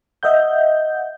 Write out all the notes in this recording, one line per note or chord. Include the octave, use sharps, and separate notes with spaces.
D#5 E5 F#5 G6